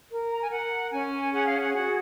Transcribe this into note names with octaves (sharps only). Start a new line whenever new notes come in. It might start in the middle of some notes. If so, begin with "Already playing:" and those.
A#4
A#5
G#5
A#4 F#5
C#4 G#5
G#4 F#5
F5
F#5
F#4 F#5